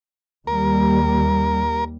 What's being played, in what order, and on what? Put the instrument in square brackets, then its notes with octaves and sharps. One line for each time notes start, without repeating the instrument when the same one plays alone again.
[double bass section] D#2 G3 [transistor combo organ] A#4